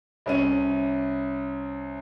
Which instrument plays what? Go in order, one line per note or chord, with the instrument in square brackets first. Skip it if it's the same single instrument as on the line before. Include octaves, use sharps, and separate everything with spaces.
[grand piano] C2 C#4 D#7